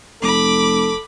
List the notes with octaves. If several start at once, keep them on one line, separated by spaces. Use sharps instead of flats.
F1 A4 B5 D6